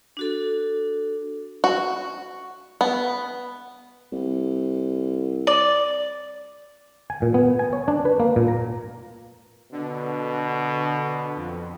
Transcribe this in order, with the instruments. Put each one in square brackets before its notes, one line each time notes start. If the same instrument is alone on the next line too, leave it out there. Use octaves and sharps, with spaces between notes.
[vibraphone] D4 F#4 A4
[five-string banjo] F#4
B3
[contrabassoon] C2
[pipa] D5
[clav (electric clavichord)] G#5
A#2
B3
G#5
C#5
D4
B4
A#3
A#2
A#5
[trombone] B2 [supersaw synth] D3
[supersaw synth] F2